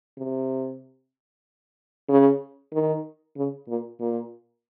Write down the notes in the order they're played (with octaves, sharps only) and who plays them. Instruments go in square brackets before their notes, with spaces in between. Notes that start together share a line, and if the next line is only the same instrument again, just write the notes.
[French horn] C3
C#3
D#3
C#3
A#2
A#2